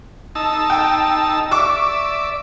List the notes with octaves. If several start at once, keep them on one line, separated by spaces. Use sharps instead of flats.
D#4 A5 E6
G5
D5 E5 C#6 D6 E6